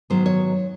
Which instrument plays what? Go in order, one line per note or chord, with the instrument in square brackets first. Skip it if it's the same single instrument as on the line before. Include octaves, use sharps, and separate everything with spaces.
[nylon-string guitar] G#2 D#3 F#3 B3 C5
C#5